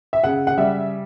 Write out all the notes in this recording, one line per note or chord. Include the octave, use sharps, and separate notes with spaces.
E5
C#3 F#5
F#5
G3 E5